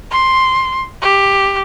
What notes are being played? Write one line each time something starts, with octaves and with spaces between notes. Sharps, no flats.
C6
G4